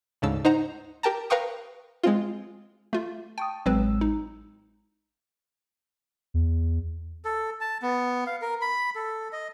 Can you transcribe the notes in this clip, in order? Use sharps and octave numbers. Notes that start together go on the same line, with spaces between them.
D2 G#2 C#3 A5 E6
D#4 C5 F#5 A#5
G4 A#4 G5 A5 A#5
A#4 B4 F5 G5 C#6 D#6
G#3 C4 F4
A3 F4
G5 A5 C#6 D#6
A1 F#3 G#3 C4 B4 E6
D#4
E2
A4
A5
B3
F5
A#4
B5
A4
D#5